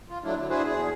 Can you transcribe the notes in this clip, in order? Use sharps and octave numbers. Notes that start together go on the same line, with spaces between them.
F4
F#3 A3 D4 E4
D3 F#3
D4 E4 F#4 G#4 B4 C5
E2 G#4